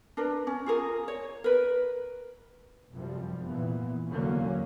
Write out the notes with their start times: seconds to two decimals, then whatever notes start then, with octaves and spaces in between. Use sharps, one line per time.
0.17 D4 A#4 B4
0.47 C#4
0.66 F4 G#4 A#4
1.08 C#5
1.44 A#4 B4
2.94 F1 F#2 C3 F3 G3
3.44 A#2 E3 B3
4.10 F1 E2 D3 F#3 A#3 C#4